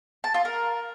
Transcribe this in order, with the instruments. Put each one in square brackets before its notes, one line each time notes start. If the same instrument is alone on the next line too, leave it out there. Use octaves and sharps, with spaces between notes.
[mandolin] A5
F4
A#4